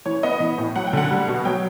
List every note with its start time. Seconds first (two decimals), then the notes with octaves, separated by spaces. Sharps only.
0.06 E3 C#5
0.23 B3 D#5
0.40 E3
0.58 A2
0.76 F#3 F#5
0.87 G5
0.93 D3 F#5
1.11 G3
1.28 B2
1.45 F#3 G5